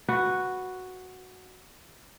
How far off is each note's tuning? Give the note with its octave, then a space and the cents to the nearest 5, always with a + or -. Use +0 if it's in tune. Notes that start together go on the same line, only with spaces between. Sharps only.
F#4 +0 B4 +0